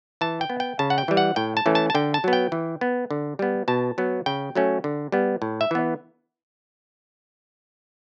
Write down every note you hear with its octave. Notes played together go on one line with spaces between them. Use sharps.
E3 A5
G5
B3
G5
C#3 A5
F#5
G5
E3 G3
F#5
A2 G5
A5
E3 A3 C#4
A5
A5
D3 G5
A5
F#3 B3
G5
E3
B3
D3
G3 B3
B2 A5
F#3 B3
C#3 G5
F#3 A3 C#4
D3
G3 B3
A2
E5
E3 B3